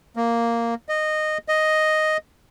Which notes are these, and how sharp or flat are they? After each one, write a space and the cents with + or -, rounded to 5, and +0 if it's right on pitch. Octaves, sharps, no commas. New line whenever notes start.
A#3 -5
D#5 -15
D#5 +0